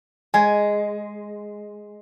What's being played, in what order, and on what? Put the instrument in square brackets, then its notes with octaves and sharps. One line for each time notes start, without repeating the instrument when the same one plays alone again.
[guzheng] G#3 [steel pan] G#5